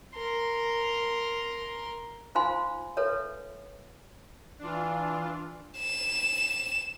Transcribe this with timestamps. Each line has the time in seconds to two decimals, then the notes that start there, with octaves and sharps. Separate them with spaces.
0.15 A#4 C6
2.35 D#4 F4 C5 F5 G#5 C6
2.97 A4 B4 C#5 E5
4.59 E3 D4 F4
5.78 E7